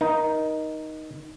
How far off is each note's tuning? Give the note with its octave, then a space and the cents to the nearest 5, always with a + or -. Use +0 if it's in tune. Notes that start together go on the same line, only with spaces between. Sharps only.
D#4 +0 A#4 +25